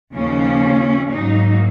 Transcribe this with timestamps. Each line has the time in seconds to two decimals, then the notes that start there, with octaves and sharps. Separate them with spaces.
0.14 D#2 C#3 F3 A#3 C#4
1.12 G#2 F#3 A#3 D#4